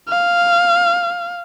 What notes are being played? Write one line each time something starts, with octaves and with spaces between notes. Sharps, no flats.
F5